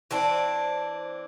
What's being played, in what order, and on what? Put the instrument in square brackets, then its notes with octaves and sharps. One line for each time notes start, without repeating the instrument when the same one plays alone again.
[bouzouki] E3 C4 D4